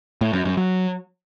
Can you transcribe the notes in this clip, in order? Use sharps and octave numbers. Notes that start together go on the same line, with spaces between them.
A2
F#2
F#2
F#3